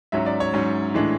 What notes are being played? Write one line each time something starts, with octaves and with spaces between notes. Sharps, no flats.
G#2 F#3 C#4 E5
D5
C#5
G#2 F#3 C#4
A2 E3 G#3 D4